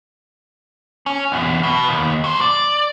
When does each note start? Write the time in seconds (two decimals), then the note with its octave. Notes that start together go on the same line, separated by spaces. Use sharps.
1.06 C#4
1.32 B1 E2
1.63 B2
1.89 D#2
2.24 F#3 C5
2.41 D5